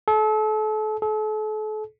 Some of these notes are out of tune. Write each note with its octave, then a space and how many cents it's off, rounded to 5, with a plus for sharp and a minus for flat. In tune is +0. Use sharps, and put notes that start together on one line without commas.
A4 -35
A4 -40